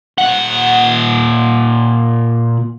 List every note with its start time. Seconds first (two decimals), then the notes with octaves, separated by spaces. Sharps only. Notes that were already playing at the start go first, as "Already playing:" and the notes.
0.18 A#2 F#5